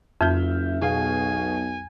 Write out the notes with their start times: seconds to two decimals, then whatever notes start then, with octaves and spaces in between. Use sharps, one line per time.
0.21 F#1 F2 E5 F6 G6
0.81 B1 B2 G#4 F5 G#5